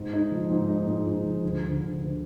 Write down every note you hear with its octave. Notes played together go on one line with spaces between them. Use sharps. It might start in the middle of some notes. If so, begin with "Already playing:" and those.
Already playing: G#2
D#4
F3
G#2
D#4
G#2
G#2
F3
D2
D3
D2
D2